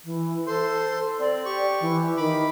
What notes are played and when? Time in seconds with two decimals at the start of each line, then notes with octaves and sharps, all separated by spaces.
0.05 E3
0.47 A4 C5 C6
1.20 C4 D5
1.45 G4 C#6
1.81 E3
2.17 D#3 B5 D6